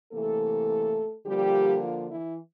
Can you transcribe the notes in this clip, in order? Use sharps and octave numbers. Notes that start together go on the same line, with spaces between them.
C3 E3 A3 A#3 A4
D3 F3 G3 A#3 G4
F3 F4
E3 E4